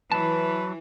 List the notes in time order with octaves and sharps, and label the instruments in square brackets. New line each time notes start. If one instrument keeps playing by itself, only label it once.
[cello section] E3 [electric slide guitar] F#3 A5 [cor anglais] B4